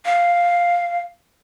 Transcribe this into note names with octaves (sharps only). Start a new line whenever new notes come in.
F5